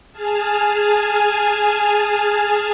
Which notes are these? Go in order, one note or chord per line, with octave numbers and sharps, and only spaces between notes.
G#4 G#5 A5 F6